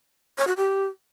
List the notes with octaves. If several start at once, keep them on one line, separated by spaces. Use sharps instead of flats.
C#5
F#4
G4